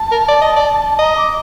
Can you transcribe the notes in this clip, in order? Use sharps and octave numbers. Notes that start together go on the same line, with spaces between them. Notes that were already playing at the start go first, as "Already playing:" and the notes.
Already playing: A5
A#4
D5
D#5
D5
D#5 A#5
D6